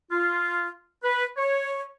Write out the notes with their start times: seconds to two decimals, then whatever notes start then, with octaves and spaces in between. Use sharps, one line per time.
0.11 F4
1.04 B4
1.37 C#5